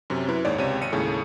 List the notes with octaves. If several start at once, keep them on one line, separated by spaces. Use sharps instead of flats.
F#2 C3 C#4
F#2 E4 B4
D#2 G#2 C#5 D5
C#2 C3 C#5 D#7
G#1 C#7 D#7
D#2 A2 C#3 G#3 A3